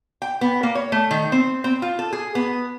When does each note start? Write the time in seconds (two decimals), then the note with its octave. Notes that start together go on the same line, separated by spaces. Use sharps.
0.22 G5
0.41 B3
0.63 A#3
0.75 C#5
0.92 A3
1.11 D#3
1.32 C4
1.64 C4
1.82 F4
1.99 A4
2.13 G#4
2.35 B3